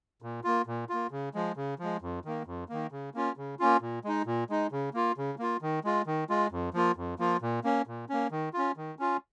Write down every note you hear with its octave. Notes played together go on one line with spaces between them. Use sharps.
A#2
A#3 F4
A#2
A#3 F4
C#3
F3 G#3
C#3
F3 G#3
F2
D#3 A#3
F2
D#3 A#3
C#3
A#3 C#4 F4
C#3
A#3 C#4 F4
A#2
G#3 D#4
A#2
G#3 D#4
C#3
A#3 F4
C#3
A#3 F4
D#3
G#3 F4
D#3
G#3 F4
F2
F3 A#3 F4
F2
F3 A#3 F4
A#2
A#3 C#4
A#2
A#3 C#4
D#3
C#4 F4
D#3
C#4 F4